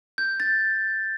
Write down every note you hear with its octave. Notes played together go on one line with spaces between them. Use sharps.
G6
A6